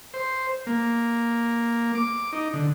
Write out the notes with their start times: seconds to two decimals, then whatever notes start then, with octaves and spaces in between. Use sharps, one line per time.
0.14 C5
0.67 A#3
1.95 D6
2.33 D#4
2.53 D3